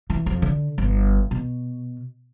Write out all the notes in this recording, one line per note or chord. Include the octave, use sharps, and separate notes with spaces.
E3
F2
D3
G1
B2